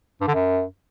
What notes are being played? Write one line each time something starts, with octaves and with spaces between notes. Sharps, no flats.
G2
D3
F#2